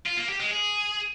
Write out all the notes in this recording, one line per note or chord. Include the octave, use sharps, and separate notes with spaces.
F4
A#3
G4
G#3
G#4